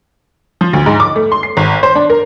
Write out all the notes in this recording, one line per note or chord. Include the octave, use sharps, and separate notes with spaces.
F3
D2
G#2
D6
A3
C6
C7
G#1
C5
D4
A#4